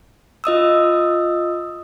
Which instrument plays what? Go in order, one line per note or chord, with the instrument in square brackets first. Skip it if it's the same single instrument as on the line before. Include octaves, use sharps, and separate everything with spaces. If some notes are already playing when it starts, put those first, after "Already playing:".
[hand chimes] F4 D#5 D#6 E6